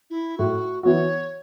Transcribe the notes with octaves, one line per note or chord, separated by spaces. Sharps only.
E4
A2 F#4
E3 B3 F#4 C#5